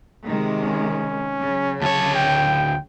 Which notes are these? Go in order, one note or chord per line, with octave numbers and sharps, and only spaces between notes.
C3 D#3 G#3
C#4
C#3 F#3
D2 C#5 A5
G5